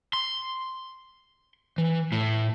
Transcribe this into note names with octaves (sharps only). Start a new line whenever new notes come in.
C6
E3
A2